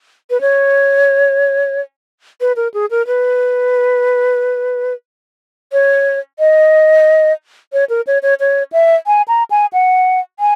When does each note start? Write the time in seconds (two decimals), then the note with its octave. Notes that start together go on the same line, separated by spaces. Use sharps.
0.30 B4
0.41 C#5
2.41 B4
2.56 A#4
2.74 G#4
2.91 A#4
3.07 B4
5.73 C#5
6.39 D#5
7.73 C#5
7.89 A#4
8.07 C#5
8.23 C#5
8.40 C#5
8.72 E5
9.07 G#5
9.28 A#5
9.50 G#5
9.73 F#5
10.39 G#5